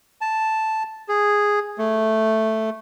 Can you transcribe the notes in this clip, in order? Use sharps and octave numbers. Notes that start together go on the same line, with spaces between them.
A5
G#4
A3